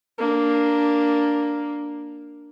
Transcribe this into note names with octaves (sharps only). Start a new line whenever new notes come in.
A#3 D4